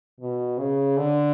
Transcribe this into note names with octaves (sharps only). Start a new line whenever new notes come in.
B2
C#3
D3